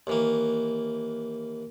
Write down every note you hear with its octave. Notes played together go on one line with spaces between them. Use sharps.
D#2 E3 A#3